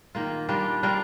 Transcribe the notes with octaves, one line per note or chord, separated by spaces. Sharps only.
D#3 A#3 F4
G3 D4 F4 A#4
G3 D4 F4 A#4